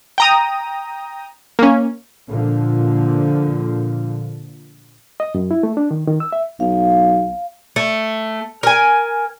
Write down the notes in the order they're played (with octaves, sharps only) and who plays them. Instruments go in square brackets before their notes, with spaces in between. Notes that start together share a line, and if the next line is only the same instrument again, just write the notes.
[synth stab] G5 A#5 D#6
A#3 C#4
[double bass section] A#2 D3 F3
[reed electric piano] D#5
F#2
E4
A3
D4
D#3
D#3
E6
E5
[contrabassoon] B1 [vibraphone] F5
[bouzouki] A3
A#4 G#5